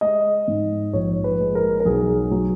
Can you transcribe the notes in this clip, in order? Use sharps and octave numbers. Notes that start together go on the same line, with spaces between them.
G#3 D#5
G#2
A#1 C#5
B4
G#3
A#4
A#4
B1 G#4
F#3